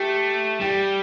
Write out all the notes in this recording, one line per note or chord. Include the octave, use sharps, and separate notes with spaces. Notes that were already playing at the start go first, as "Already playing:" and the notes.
Already playing: A3 G4
G3 G4